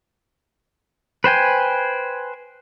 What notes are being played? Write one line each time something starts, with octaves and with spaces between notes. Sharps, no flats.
B4 C5 G5 G#5